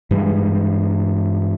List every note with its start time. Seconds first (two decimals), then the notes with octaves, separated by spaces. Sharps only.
0.11 G2 E3 G3 G#3